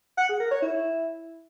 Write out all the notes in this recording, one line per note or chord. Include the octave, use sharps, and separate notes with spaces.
F#5
G#4
A#4
C#5
E4